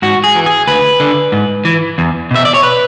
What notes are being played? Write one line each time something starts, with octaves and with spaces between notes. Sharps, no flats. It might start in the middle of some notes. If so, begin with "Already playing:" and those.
G#2 F#4
G#4
E3
G#4
D2 B4
D3
G#2
E3
E2
B2 E5
D5
C#5
B4